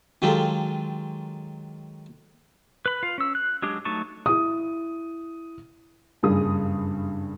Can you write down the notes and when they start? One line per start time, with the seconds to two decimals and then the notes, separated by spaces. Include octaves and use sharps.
0.22 D#3 F#3 G#3 F4 G4 A4
2.86 B4 B5
3.03 F4 F5
3.18 C#4 E6
3.35 F#6
3.62 F#3 G#3 D4 G4
3.85 F#3 A3 D#4 A5 C#6
4.26 E4 D#6
6.23 F#1 G2 G3 G#4 D#6